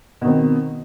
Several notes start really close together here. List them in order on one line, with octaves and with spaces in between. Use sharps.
B2 D#3 C4